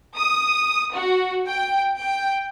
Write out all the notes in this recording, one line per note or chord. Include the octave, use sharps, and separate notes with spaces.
D#6
F#4
G5
G5